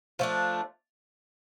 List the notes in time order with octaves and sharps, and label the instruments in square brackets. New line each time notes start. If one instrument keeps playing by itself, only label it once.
[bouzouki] F3 A3 D4